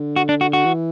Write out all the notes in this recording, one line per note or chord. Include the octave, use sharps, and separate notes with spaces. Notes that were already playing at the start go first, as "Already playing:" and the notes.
Already playing: D3
F#4
D4
F#4
F#4
E3